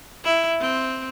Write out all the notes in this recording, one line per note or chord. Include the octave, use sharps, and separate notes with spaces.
E4
C4